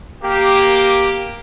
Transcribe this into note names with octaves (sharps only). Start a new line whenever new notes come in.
A#3 G4